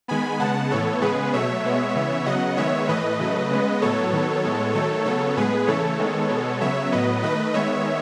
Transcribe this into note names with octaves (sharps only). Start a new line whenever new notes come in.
D#3 G#3 B3 G#5 B5
C#3 G#3 B3 F#5 A5
A2 E3 B3 A4 C#5
C#3 G#3 B3 G#4 B4
B2 F#3 A3 C#5 E5
B2 G#3 B3
C#3 E3 B3
C#3 F#3 B3 D#5 F#5
D#3 G#3 B3 C#5 E5
A2 E3 A3 B4 D#5
C#3 F#3 A3
C#3 G#3 B3
A2 F#3 B3 A4 C#5
D#3 F#3 B3
A2 G#3 B3
D#3 F#3 A3 A4 C#5
C#3 F#3 B3 A4 C#5
A2 G#3 B3 G#4 B4
C#3 E3 A3 A4 C#5
D#3 G#3 B3
B2 G#3 B3
C#3 F#3 B3 C#5 E5
A2 F#3 B3 B4 D#5
D#3 A3 B4 D#5
D#3 G#3 B3 C#5 E5